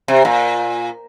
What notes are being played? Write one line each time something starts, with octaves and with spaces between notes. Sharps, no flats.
C3
A#2